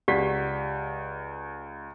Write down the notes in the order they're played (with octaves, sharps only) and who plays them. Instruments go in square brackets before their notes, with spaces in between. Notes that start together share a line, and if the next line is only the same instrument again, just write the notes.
[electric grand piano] C#2 B6 [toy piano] G4 [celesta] D5 F#5